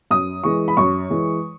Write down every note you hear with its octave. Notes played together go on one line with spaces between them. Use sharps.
F#2 D#6
E3 G#3 C#6
B5
F#2 C#6
E3 G#3